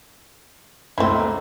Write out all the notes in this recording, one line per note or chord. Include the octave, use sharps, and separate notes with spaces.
C#2 A3 A#3 C4 E4